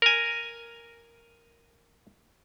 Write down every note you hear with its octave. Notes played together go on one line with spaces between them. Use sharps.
A#4 G#5